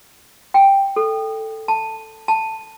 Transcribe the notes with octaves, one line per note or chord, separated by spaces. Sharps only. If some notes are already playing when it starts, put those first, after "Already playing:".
G5
A4
A5
A5